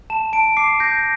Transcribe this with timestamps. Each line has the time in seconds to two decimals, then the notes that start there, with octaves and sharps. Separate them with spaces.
0.10 A5 E7
0.33 A5 D7
0.57 D6 C7
0.80 G6 A#6